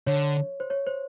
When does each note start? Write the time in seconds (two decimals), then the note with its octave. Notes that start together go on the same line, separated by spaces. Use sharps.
0.07 D3 C#5
0.60 C5
0.70 C#5
0.86 C5